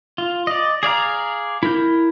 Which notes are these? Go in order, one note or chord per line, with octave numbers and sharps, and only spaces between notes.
F4
D5 D#5
G#4 D5 F5 A#5
E4 A#4 G6